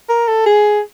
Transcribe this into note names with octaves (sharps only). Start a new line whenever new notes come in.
A#4
A4
G#4